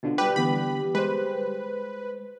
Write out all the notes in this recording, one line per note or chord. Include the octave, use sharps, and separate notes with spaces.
B2 D3 F3
G3 G4 B4
D3 E3 B3 B5
G#3 B4 C5